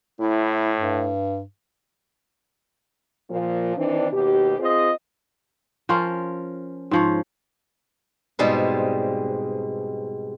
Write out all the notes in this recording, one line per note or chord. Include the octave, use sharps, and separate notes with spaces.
A2 E4
G2
A#2 F3
D#3 E3 C4 D4
D#2 B2 G4
C4 F4 G#4 C5 D#5
F3 C#4 F4 A#4
G#2 F3 C#5
G#2 B2 G3 G#3 C4 F4